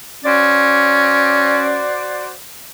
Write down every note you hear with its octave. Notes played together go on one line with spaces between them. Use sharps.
C#4 F#4 C5 D5